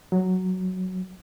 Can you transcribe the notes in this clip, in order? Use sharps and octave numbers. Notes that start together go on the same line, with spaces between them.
F#3